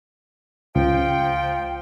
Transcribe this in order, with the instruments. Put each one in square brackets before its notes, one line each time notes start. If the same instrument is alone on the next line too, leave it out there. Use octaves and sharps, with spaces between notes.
[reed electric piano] C#2 [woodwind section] F3 G5